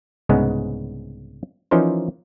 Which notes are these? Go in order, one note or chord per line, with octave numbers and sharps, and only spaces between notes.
C2 G#2 C#3 G#3 B3
E3 F3 C#4 D#4 A#4 C5